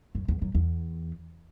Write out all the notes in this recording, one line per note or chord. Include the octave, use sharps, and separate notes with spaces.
F#2
E2
F#2
E2